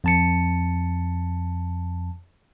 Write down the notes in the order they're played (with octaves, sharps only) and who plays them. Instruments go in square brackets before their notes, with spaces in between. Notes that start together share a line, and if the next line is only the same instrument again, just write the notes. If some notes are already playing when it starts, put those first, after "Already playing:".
[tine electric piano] F2 A5 C#7